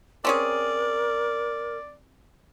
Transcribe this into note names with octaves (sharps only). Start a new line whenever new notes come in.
C4 C#4 G#4 A#4 D5